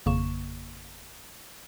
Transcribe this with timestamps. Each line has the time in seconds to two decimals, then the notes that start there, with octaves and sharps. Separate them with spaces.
0.06 G#1 F2 C#3 A#3 C#6 E7